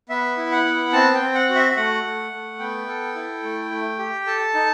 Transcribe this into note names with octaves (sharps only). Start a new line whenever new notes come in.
B3 E5
E4
F#5
B3
C4 A5
G5
C4
F#5
F#4
E5
E5
A3 F#5
A3
A3
B3 G5
A4
E4
A3
A3
G4
A4 A5
D#4